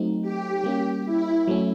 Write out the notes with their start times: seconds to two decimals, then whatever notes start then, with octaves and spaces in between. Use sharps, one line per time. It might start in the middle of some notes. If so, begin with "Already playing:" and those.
Already playing: F#3 A3 C4 D#4
0.22 G4
0.64 G3 A#3 C#4
1.06 E4
1.48 F#3 A3 C#4